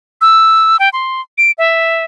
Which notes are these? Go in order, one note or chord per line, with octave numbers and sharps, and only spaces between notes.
E6
G5
C6
D7
E5